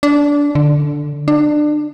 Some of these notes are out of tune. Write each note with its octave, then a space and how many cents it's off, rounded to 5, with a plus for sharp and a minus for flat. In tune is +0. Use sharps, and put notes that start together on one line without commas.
D4 -20
D3 +5
D4 +25